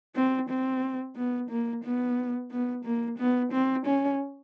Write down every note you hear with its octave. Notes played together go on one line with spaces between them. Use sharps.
C4
C4
B3
A#3
B3
B3
A#3
B3
C4
C#4